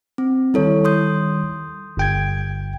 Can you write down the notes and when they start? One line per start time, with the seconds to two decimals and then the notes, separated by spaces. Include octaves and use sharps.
0.18 C4
0.54 D#3 G3 E4 A4 C#5
0.85 C6 D#6 G6
1.97 G1 G5 G#6